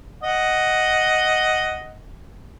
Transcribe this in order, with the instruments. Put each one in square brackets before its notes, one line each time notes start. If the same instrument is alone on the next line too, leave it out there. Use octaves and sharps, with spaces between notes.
[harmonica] D#5 F#5